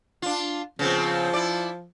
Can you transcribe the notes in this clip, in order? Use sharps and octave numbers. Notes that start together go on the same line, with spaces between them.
D4 F4
C#3 F3 B3 C4
E4 D5